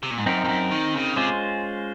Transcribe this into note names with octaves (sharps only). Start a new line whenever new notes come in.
C3
A#2
G#2
F#2 C4 D#4 A#4
F2
F#2
D#3
C#3
C3 G#3 C#4 F4 C5